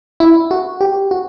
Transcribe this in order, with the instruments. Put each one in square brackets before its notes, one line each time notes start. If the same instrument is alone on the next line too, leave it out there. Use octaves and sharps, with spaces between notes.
[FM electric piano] E4
F#4
G4
F#4